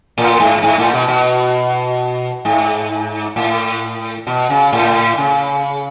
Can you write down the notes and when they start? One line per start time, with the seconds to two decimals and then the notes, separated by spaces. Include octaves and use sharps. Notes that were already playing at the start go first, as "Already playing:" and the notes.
0.18 A2
0.40 G#2
0.63 G#2
0.78 A2
0.93 B2
1.08 B2
2.45 G#2
3.36 A2
4.27 B2
4.50 C#3
4.72 A2
5.18 C#3